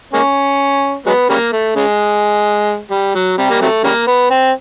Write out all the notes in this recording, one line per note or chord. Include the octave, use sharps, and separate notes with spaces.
G#3 A#3 C#4
F#3 G#3 B3
C#3 G3 A#3
A3
C#3 G#3
G3
F#3
C3 G3
A#3
C3 F#3 A3
C#3 G3 A#3
B3
C4